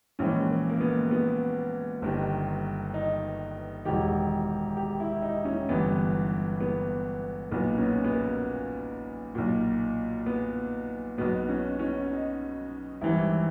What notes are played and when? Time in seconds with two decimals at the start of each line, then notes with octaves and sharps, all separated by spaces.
0.19 A#1 G#2 E3 C#4
0.49 A#3
0.70 A#3
0.81 B3
1.11 B3
2.02 G1 G2 D#3
2.94 D#4
3.85 E1 E2 D#3 G4
4.77 G4
5.00 E4
5.22 D#4
5.45 C#4
5.69 G1 G2 E3 B3
6.60 B3
7.51 B1 A#2 B3
7.78 C#4
7.83 B3
8.04 B3
8.13 A#3
9.35 B1 A#2
10.26 B3
11.18 B1 B2 B3
11.49 C#4
11.79 C#4
12.09 D#4
13.01 G#1 G2 E3 E4